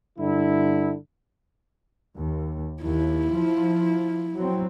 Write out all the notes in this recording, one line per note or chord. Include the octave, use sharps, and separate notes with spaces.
G2 D3 E4
D#2
D#2 E4
F3
F#3 C4